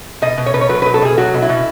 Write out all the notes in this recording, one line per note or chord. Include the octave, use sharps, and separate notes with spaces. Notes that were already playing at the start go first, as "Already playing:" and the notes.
B2 D#5
B2
C#5
B2 B4
C#5
F#3 B4
B4
B2
A4
B2 G#4
F#3 F#4
B2
E4
B2